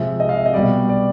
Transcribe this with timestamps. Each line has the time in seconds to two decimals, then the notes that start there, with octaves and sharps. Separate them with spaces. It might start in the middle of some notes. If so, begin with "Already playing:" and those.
Already playing: C3 F3 G#3 E5
0.20 D#5
0.29 F5
0.36 E5
0.46 D#5
0.54 B2 G3 D5
0.89 D5